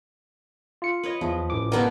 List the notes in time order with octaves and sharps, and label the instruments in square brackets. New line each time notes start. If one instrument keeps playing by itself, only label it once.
[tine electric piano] F4 C#7
[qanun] B4 C#5 D#5
[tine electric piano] E2 [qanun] F3
[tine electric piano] A1 E3 D6
[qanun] D3 G#3 [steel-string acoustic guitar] A#3 B3